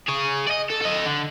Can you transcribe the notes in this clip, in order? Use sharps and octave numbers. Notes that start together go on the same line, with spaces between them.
G#4 C#5
D5 D#5
A4
A4 D#5
D3